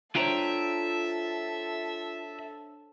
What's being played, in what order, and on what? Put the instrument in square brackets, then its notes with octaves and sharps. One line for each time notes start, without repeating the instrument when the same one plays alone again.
[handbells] D4 C5 C#5 [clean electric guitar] F4 G5 A#5 [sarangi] A4 [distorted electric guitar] E5